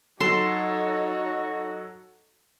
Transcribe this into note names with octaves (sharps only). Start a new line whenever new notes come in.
F#3 D#4 F#4 A4 C#5 C6 E7